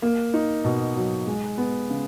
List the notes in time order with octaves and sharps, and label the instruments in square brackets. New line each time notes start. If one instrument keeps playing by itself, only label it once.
[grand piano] A#3
D#4
B2
F#3
G#3
B3
C#3